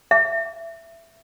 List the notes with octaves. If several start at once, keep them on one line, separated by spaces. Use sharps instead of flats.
E5